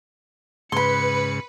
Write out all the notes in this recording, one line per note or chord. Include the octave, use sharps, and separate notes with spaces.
G#2 C#3 B4 B5 C6 C#7